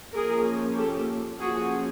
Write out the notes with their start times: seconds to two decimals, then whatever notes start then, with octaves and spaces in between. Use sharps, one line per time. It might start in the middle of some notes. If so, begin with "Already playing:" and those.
0.15 F3 A#3 C#4 G#4 A#4
0.77 G4 A4
1.40 F3 A#3 C#4 F#4 G#4